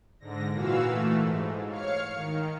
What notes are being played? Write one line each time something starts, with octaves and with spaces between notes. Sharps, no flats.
G#2 D3 A#6
A#2 E3 F#4 F5 E6
E3 A3
G#2
C#5 F5 F6 C#7
D#3